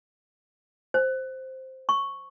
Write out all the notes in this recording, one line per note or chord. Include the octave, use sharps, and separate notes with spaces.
C5
C#6